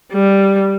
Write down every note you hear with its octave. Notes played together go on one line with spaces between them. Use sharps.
G3